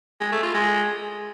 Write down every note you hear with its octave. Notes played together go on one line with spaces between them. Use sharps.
G#3
A3
F4
G#3